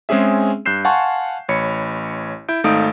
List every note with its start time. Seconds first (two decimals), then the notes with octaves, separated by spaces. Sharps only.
0.09 G#3 C4 C#4 G#4 E5
0.66 G2 F#6 G6 C7 E7
0.85 F5 F#5 G#5 A5 C6 C#6
1.49 A1 C#5 B5 C#7
2.49 E4 G6 D7
2.64 G#1 A3 D#4 F5 D#6 D7